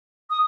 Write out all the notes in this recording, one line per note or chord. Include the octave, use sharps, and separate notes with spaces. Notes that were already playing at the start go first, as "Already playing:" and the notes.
D#6